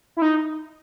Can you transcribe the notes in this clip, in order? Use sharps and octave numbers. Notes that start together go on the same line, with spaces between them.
E4
D#4